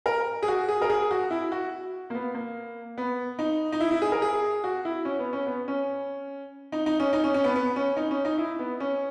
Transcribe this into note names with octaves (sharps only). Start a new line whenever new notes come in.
A#4
G#4
F#4
G#4
A#4
G#4
F#4
E4
F#4
A#3
B3
A#3
B3
D#4
D#4
E4
E4
G#4
A#4
G#4
F#4
E4
C#4
B3
C#4
B3
C#4
D#4
D#4
C#4
D#4
C#4
C#4
B3
B3
C#4
D#4
C#4
D#4
E4
B3
C#4